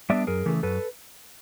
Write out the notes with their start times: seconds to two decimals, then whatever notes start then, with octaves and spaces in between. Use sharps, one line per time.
0.10 G3 B3 D4 D5 E5
0.27 F#2 G#4 A#4
0.46 C#3 E3 A3
0.63 F#2 A4 B4